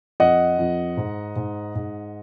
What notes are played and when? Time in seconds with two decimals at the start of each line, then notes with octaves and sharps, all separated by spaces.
0.20 F2 D#5 F#5
0.59 F2
0.97 G#2
1.36 G#2
1.75 G#2